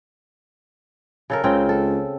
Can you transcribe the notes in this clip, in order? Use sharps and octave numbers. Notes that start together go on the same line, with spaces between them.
C#3 A4 A#4
C#2 C#3 C4 G5
A4